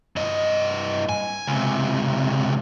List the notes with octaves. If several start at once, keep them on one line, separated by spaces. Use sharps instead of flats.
G2 D#5
G#5
C#2 C3